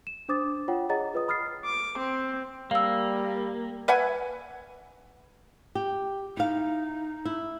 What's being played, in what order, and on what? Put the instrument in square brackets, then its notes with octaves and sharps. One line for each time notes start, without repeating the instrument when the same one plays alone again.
[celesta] E7
D4 C5 D6 D#6 A6
F4 C#5 F#5 G5
G#4 C#5 D#5 F#5 A#5 A6
F4 B4 D#5 D#6
B5 D#6 F6 A6 C7
[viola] D6
C4
[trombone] G3 [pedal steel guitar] A#3 [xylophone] F5 E6
[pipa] B4 E5 F#5 G#5
[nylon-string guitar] G4
[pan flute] D#4 [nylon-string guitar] E4 F5
[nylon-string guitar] E4